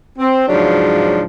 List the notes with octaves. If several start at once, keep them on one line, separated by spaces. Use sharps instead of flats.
C4
G#2 C#3 F3 F#3 D4